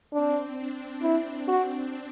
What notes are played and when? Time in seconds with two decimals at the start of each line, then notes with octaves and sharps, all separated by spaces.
0.13 C4 D4
0.58 D4
1.03 D4 E4
1.48 F#4